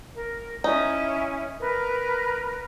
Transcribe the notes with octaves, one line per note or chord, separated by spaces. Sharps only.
A#4
C#4 D#4 E4
A#4 B4